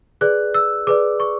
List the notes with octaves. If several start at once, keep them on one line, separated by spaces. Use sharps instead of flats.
G#4 B4 D5 F#6
E6
G#4 B4 D5 D6
C#6